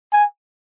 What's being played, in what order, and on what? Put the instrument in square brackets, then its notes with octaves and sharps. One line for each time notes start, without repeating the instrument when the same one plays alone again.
[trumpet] G#5